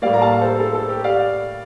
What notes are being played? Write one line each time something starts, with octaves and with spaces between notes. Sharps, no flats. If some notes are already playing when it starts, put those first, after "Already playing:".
A2 G3 A#3 D5 F5
A#5
F5 A5
A4 C5
A4
A4
G4
D5 F5